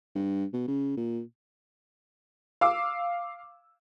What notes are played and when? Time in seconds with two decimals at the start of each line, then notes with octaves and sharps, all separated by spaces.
0.15 G2
0.53 B2
0.68 C#3
0.97 A#2
2.61 F5 D6 E6